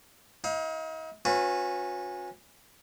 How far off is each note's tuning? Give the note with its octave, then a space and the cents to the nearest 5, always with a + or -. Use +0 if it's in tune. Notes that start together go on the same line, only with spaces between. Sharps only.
D#4 +45 F5 +30
C#4 -15 F#4 -40 B4 +0